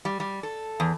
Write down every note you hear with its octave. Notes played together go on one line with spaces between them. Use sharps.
G3
G3
A4
E2